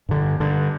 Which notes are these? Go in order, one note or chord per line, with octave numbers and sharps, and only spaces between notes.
G2 D3
G2 D3